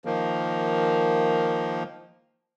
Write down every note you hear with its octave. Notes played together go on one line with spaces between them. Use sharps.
D#3 F3 A#3